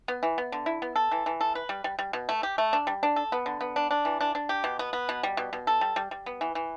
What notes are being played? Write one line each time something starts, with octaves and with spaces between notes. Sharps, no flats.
B3
E3
B3
D3
E4
B3
A4
E3
E3
A4
B4
G3
G3
G3
B2
A3
G4
A3
D4
G3
D4
A4
B3
D3
B3
D4
D4
E3
D4
D4
G4
B2
B3
B3
B2
G3
B2
B2
A4
G3
G3
G3
B3
E3
E3